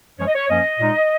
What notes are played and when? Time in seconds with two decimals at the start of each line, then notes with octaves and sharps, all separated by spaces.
0.19 F#2 F3 G#3 C#4 C#5
0.27 D#5
0.34 C#5
0.49 F#2 F3 A#3 C#4 D#5
0.79 A#2 G#3 D#4